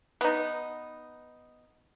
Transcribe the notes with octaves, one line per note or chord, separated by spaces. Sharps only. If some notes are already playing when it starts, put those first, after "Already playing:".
B3 D#4